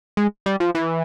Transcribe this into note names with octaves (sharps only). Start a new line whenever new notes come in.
G#3
G3
F3
E3